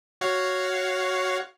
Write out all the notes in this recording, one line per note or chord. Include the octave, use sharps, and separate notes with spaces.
F#4 C#5 F5